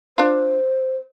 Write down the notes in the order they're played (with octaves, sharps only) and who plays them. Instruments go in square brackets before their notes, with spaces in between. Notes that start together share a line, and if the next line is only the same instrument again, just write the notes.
[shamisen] D4 F4 [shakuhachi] C5